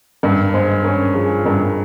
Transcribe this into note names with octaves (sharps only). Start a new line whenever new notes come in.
G2 A#4
G#3 C5
C#4 A#4
F3 G#4
G2 A#4